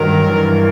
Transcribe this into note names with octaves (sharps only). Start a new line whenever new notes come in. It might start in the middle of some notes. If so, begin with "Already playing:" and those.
Already playing: G2 D#3 F#3 A#4
G2 E3